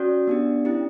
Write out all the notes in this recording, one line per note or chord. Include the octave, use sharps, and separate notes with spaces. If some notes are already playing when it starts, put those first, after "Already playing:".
Already playing: C#4 F#4 D5
B3 D4 G4
C#4 E4 G4